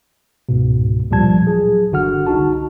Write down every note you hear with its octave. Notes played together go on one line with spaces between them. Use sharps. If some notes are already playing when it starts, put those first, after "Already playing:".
C#2 G#2 B2
D2 A#2 F3 G3 A5 G#6
F#3 G#4
G1 D3 F#4 F#5 F6
C2 D#4 F#4 A5